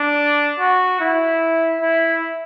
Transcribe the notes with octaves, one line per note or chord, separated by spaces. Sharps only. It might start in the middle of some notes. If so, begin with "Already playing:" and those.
Already playing: D4
F#4
E4
E4